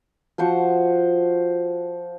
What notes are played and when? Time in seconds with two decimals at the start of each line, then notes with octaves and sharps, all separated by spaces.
0.38 F3 F#4 C5 C#6